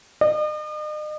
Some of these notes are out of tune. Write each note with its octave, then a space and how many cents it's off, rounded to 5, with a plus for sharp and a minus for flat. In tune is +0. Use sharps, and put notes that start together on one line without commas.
D#5 -45